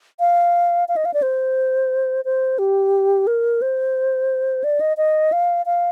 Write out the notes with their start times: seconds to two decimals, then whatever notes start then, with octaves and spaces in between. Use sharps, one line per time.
0.20 F5
0.88 F5
0.96 D#5
1.05 F5
1.14 D5
1.22 C5
2.25 C5
2.59 G4
3.27 A#4
3.62 C5
4.64 D5
4.81 D#5
4.97 D#5
5.32 F5
5.66 F5